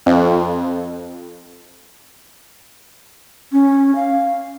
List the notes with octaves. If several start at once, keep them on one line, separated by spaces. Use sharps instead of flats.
F2
C#4
F5